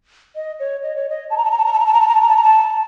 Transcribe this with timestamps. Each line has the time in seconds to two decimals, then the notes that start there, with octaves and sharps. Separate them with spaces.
0.36 D#5
0.60 C#5
0.83 D#5
0.96 C#5
1.09 D#5
1.30 A5
1.37 A#5
1.45 A5
1.51 A#5
1.58 A5
1.66 A#5
1.73 A5
1.80 A#5
1.86 A5
1.94 A#5
2.01 A5
2.08 A#5
2.15 A5
2.22 A#5
2.29 A5
2.37 A#5
2.43 A5